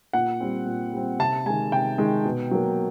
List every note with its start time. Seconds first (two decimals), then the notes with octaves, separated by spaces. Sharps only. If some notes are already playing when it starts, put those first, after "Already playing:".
0.13 A#2 F#5
0.40 G3 C4
0.66 A#2
0.93 G3 C4
1.19 C3 A5
1.46 D#3 G#3 G#5
1.72 C3 G5
1.98 D#3 G#3
2.25 B2
2.51 F#3 A#3